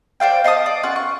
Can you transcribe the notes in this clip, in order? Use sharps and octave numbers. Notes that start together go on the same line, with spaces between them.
C5 D5 F5 G5
D#5 F5 A5 D#6
D5
C#4 F4 F#5
C#6